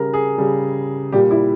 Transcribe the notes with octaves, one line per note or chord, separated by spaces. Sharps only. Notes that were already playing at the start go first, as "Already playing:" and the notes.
Already playing: C#3 G3 A#4
G#4
C#3 G3
A#2 G3 G4
E4